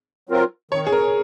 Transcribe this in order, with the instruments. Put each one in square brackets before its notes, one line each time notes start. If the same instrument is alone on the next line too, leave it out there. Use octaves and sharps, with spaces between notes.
[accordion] F#3 C4 F4 A#4
[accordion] D#3 [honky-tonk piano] C#5
[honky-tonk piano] G#4
A#4